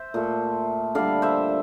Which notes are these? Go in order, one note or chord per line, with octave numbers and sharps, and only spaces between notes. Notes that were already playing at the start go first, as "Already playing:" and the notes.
Already playing: C5 E5
A#2 A3
D3 G3 D5 F5
C5 E5